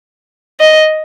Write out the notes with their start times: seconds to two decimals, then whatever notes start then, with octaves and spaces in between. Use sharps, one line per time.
0.60 D#5